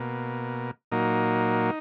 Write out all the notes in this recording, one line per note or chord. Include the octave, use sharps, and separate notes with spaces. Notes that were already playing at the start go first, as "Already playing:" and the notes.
Already playing: B2 A#3
A#2 F#3 A#3 D#4